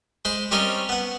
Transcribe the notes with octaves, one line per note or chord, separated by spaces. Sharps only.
G#3 C5 B5
G3 C4 C#4 A#4 C#5 D#5
B3 F#5